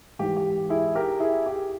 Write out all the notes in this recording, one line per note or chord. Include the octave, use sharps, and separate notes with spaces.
G#2 E3 G4
G4
E4 G#4
G4 A#4
E4 G#4
G4